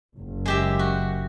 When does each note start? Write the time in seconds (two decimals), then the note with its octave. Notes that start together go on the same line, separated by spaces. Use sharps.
0.16 F#1
0.46 G#3 G4 E5
0.79 F#4